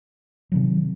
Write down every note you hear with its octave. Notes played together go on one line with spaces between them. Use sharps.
C3 D#3 F#3